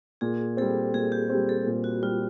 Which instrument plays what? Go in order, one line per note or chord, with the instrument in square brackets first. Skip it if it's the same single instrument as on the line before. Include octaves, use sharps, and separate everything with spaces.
[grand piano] A#2 [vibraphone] G#4
[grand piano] G3 C4 [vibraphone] A4
[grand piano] A#2 [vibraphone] G#4
[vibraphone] G4
[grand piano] C4
G3
[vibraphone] A4
[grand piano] A#2
[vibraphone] F#4
[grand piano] G3 C4 [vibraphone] F4